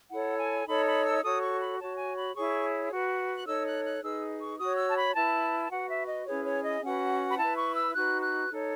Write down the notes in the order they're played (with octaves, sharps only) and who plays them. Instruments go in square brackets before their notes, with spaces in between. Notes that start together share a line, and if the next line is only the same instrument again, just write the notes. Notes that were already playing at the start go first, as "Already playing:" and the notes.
[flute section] E4 A4 C#5 F#5
G#5
D#4 A4 C#5 B5
B5
E6
F#4 A4 C#5 D#6
C#6
B5
F#4 C#5 A5
G#5
B5
E4 G#4 C#5 C#6
F#4 B4
F#6
D#4 A4 C#5 E6
F#6
F#6
D#4 G#4 B4 E6
C#6
F#4 C#5 D#6
E6
A5
B5
E4 B4 A5
F#4 B4 F#5
E5
D#5
C#4 E4 G#4 B4 C#5
C#5
D#5
C#4 F#4 B4 F#5
B5
E4 B4 A5
C#6
E6
D#4 F#4 B4 F#6
F#6
D#4 A4 C#5